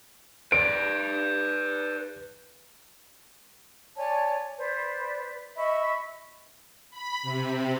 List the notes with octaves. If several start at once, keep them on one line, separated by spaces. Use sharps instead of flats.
B4 D5 D7
C#5 D5 G#5 A5
B4 C5 D5
D#5 E5 B5 C#6
B5
C3